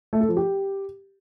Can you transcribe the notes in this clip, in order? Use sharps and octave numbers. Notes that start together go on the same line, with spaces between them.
A3
A4
F3
G4